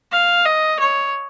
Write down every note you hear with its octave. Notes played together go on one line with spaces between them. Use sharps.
F5
D#5
C#5